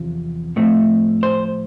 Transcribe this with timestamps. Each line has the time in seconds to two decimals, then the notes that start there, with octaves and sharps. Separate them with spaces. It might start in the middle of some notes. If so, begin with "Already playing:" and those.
Already playing: E2 C3 F3
0.56 A2 F3 A3 C4
1.23 C5